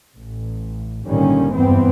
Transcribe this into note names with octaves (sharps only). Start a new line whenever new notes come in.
A1
G#1 A#2 D3 D#3 G3 C#4
F#1 E2 G2 E3 B3 C4